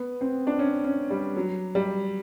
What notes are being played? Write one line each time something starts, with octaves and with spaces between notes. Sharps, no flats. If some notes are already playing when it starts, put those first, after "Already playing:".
Already playing: B3
C4
D4
C#4
C#4
G3
F#3
G3